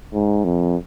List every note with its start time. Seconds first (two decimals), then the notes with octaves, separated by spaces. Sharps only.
0.14 G#2
0.44 F2